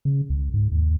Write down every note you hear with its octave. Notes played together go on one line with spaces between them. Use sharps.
C#3
C#2
G#2
D#2